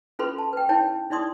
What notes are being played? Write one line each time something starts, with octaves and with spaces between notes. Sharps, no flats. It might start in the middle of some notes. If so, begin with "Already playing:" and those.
C#4 F4 A4 B4 B5 C6
A5
B4 G5
D#4 E4 C#5 G5 A5
D#4 E4 D5 C6 D#6